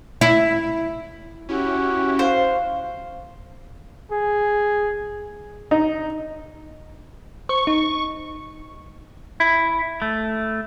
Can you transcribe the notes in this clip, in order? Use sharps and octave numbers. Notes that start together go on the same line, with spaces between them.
E4
C#4 E4 F#4 G4
C5 F5
G#4
D#4
C5 C#6
D#4
E4
A3